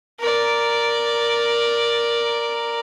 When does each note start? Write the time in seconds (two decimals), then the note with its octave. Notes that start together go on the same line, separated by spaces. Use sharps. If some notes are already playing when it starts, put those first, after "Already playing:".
0.19 A#4 D5